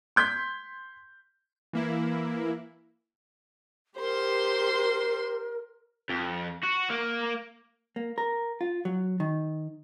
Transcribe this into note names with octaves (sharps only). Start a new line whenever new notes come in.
C6 G6 G#6 B6
E3 A#3 E4
G4 A#4 C5 C6
F2
F#4
A#3
A#3
A#4
F4
F#3
D#3